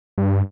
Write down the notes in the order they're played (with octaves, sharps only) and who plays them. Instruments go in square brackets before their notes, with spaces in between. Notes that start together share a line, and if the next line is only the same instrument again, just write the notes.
[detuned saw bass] G2